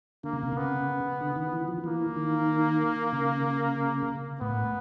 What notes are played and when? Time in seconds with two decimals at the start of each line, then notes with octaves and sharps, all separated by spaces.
0.24 D3 A#3
0.33 C#3
0.43 C3
0.52 C#3 B3
1.21 D3
1.36 D#3
1.53 E3
1.68 F3
1.84 E3 A#3
2.17 D#3
3.13 C#3
4.41 A2 B3